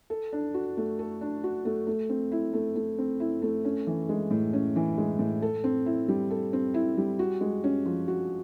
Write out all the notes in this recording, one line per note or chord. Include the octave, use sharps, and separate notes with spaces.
A4
D4
F#4
A3
A4
D4
F#4
A3
A3
C4
E4
A3
A3
C4
E4
A3
C#4
E3
G#3
A2
C#4
E3
G#3
A2
A4
C4
E4
G3
A4
C4
E4
G3
F#4
G#3
C#4
F3
F#4